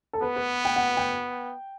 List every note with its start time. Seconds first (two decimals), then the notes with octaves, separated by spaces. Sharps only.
0.13 A4
0.21 B3 B4
0.36 B4
0.65 G5
0.76 F#5
0.97 G5